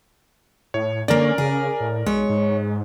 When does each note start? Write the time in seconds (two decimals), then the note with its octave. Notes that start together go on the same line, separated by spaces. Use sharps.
0.74 A2 C#5
1.08 D3 A#3 C#4 A#4 D5
1.38 C#3 G#4
1.80 A2
2.06 B1 G#3 C#5
2.29 G#2